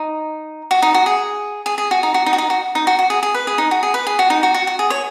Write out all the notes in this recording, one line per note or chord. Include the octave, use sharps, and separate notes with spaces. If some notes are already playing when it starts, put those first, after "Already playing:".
Already playing: D#4
F#4
D#4
F#4
G#4
G#4
G#4
F#4
D#4
F#4
D#4
F#4
D#4
F#4
D#4
F#4
F#4
G#4
G#4
B4
G#4
D#4
F#4
G#4
B4
G#4
F#4
D#4
F#4
F#4
F#4
G#4
C#5